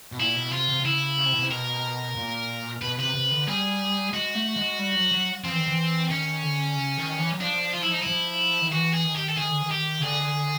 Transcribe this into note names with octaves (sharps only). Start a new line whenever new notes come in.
B2
A#2 E4
B2
C3 F4
C3
C3
C#3 E4
C#3
C3
B2
C3
B2 A#4
A#2
B2 B4
C3 B4
C3
D3
G3 G#4
G#3 F#4
A3
G#3
G3
F#3
F#3
F3 C4
E3
D#3
E3
D#3 C#4
D3
C#3
D#3
E3
F#3
F3 D4
F4
E4
D#4
E4
F3
D#3
E3 F#4
G#4
D#3
G4
A4
D#3 G#4
D3
D#3
G4
C#3
D3 G#4